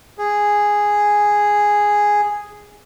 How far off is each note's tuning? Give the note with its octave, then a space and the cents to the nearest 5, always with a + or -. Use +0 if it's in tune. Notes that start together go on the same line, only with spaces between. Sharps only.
G#4 -5